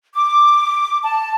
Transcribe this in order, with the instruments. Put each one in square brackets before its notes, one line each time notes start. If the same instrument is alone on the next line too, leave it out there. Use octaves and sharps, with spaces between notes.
[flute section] D6
A5